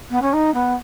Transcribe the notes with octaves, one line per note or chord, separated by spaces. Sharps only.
B3
C#4
D#4
B3